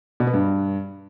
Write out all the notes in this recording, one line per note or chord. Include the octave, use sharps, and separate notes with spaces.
B2
B3
G2